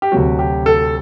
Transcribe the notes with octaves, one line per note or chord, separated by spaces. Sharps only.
G4
D2 C3 F#3 F#4
G4
A4